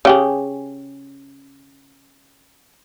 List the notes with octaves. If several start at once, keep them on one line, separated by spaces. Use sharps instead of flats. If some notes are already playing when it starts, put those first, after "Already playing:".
C#3 G4 G#4